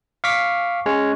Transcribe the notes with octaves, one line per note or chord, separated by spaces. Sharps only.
F5 C#6 D6 B6
G#3 C#4 C#5